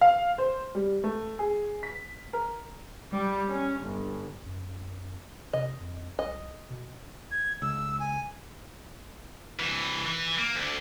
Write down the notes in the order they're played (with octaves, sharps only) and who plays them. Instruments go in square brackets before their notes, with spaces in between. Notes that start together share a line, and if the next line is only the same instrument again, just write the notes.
[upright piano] F5
C5
G3
A3
G#4
B6
A#4
[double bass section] G3
C#4
G1
[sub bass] F#2
[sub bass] C3 [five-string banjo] D#5
[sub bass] F2
[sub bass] C2 [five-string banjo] D#5
[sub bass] B2
[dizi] G#6
[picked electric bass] C#2 [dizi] E6
[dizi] G#5
[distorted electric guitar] C2 E3
E3 E4
A#3
D2 D3